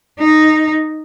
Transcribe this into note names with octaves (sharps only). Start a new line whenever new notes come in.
D#4